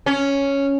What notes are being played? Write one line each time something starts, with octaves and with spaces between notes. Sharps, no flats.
C#4